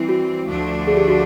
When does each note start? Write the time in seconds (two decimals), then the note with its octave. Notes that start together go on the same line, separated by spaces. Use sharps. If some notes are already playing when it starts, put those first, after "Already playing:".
Already playing: E3 G3 C4 E4
0.09 F#4
0.47 D2 D3 F3 A3 D4
0.87 G#4
0.97 G4
1.08 F#4